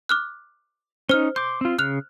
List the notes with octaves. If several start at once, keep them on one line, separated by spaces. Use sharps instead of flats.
D6 F6 F#6
C#4 D#4 C5 F6
C6 D6 G6
C4 F4
C#3 F6 F#6 F7